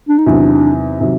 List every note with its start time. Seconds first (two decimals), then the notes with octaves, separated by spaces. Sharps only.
0.09 D4
0.18 D#4
0.26 E2 C3 D#3 F#3 D4
1.00 C3 D#3 F#3